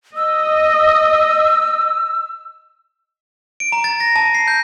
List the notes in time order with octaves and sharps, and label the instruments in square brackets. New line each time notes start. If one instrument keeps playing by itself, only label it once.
[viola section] D#5 [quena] E6
[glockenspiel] D7
A#5
A6
A#6
A5
C7
G6